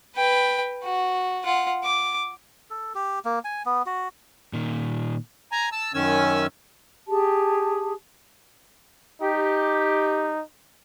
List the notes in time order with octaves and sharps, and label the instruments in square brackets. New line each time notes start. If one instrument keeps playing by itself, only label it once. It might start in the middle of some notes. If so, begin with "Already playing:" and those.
[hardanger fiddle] B4 G5
F#4
F4 F#5
D6
[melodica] A4
G4
A#3
G#5
B3
F#4
[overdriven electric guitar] A#2 D#3
[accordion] G#5 A#5
A5 E6
F#2 D#3 C#4 G#5 E6
[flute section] G4 G#4 A5
[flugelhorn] D#4 [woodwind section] G4